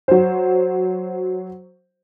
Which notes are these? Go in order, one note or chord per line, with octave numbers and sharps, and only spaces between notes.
F#3 C5